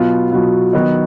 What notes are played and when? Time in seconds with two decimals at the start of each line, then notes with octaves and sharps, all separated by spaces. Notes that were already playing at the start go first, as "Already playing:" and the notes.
Already playing: B2 F#3 B3 F4
0.31 B2 F#3 B3 F4
0.73 D#3 F#3 B3 D#4